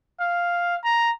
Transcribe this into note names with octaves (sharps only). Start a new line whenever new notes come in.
F5
A#5